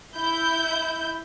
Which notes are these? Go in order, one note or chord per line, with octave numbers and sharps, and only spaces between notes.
E4 G6